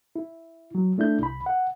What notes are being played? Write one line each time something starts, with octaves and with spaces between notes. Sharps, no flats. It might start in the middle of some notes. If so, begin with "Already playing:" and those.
E4
F#3
A3 D4 E4 G6
C2 B5
F#5